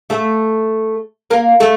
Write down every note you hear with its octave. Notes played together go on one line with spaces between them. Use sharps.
A3 A4
A#3 A#4
A3 A4